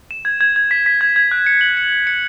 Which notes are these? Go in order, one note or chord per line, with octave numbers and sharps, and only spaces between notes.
E7
G#6
G#6
G#6
B6
B6
G#6
G#6
F#6
C#7
F#7
C#7
C#7
C#7